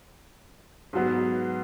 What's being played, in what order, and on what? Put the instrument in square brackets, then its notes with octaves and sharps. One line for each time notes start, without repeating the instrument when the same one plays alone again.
[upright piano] G#2 F#3 B3